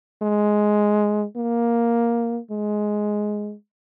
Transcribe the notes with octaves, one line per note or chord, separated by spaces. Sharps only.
G#3
A#3
G#3